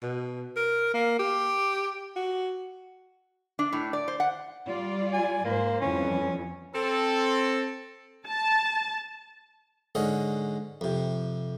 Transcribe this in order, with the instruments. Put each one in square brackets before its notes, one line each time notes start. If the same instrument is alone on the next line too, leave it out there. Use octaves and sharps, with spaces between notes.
[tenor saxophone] B2
A#4
A#3
G4
F#4
[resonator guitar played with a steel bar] D4
A2
D5
C5
F#5
[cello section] G3 F4 D5
[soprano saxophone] G#5
[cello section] G#2 C5 [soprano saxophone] A#3
[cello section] F2 E3 G3 [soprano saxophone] C#4
[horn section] C4 A4
[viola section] A5
[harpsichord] G#2 D3 C#4 D#5
F2 C3